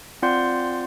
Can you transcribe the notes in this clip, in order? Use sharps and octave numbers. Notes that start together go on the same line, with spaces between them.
C4 F4 D5 F#5 C6 G6